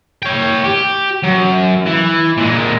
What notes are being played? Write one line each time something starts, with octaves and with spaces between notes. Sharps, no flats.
C#5 G5
G4
F#2
E3
A#2 G#3